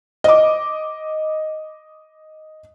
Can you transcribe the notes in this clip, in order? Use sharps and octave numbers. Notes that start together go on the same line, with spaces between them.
D#5 D6